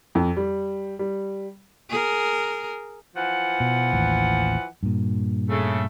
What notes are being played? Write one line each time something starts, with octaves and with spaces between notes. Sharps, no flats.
F2
G3
G3
G#4 A#4
E3 F3 F#5
B2
A1 D#2
G2 A#2
C#3 A3